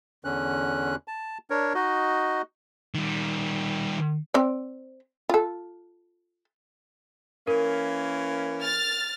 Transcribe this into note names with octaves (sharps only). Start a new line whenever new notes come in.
E2 D3 C#4 F#6
A5
D4 A#4 C#5
D#4 F#4 D#5
D#3 G3
C4 D5
F4 A4
E3 A#3 C#4 A#4
F6 A6